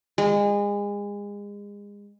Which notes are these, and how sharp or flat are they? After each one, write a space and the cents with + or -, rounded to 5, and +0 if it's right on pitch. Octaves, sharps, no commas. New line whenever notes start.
G#3 -30